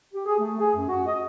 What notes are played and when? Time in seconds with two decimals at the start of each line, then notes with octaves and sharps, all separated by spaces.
0.14 G4
0.26 G#4
0.38 A3
0.59 G#4
0.75 F#2
0.88 F#4
1.06 D#5